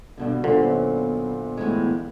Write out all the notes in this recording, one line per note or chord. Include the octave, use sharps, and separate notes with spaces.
G2 B2 D3
G2 A#2 D3 B3 F4 C5
F#2
A2 E3 G#3